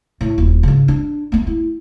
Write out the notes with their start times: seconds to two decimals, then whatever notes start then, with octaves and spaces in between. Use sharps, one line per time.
0.21 A2
0.38 D#1
0.63 G#2 C#3
0.88 D4
1.32 A3 B3
1.47 E4